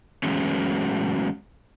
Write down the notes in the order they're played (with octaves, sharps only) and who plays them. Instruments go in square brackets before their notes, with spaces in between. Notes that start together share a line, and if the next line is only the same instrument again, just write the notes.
[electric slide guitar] E3 F#3 G#3 A3 B3 C#4